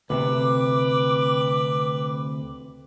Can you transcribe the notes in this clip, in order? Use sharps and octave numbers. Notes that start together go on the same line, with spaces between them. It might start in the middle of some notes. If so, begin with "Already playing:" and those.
D2 A2 C3 B4 D6